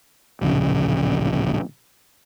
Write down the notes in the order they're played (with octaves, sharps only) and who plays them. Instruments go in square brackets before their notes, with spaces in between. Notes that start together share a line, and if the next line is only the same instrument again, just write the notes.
[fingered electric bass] D1 A#1 C#3